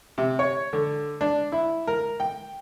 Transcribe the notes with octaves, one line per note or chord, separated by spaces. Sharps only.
C3
C#5
D3
D4
E4
A#4
G5